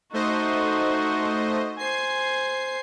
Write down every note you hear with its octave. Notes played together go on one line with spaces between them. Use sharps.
A3 D#4 F#4 C5 D#5
C5 G#5 C7